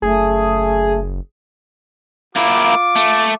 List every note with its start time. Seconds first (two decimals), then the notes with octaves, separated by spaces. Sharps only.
0.02 F#1 A3 G#4
2.36 A#3 E4 F4 D6
2.96 A3